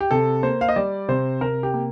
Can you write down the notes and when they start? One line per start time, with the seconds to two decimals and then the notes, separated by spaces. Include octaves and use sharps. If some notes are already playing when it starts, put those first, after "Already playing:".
0.01 G4
0.11 C3 A4
0.43 A#3 C5
0.61 F5
0.69 D#5
0.76 G3 D5
1.09 C3 C5
1.41 C3 A#4
1.63 G4
1.74 A#3